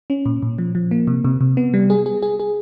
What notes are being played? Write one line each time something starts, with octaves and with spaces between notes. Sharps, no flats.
C#4
A#2
A#2
F3
F3
A#3
C3
C3
C3
B3
G3
G#4
G#4
G#4
G#4